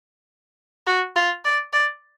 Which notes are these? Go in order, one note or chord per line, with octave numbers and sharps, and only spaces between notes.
F#4
F4
D5
D5